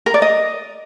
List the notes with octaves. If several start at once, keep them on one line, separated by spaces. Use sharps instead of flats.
A#4
D5
D#5